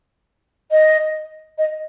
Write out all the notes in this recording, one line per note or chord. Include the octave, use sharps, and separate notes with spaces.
D#5
D#5